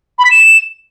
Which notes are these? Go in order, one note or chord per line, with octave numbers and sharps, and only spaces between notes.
B5
B6
E7